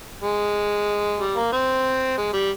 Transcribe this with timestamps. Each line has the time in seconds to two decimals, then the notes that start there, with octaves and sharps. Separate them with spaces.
0.22 G#3
1.20 G3
1.36 A#3
1.53 C4
2.18 G#3
2.33 G3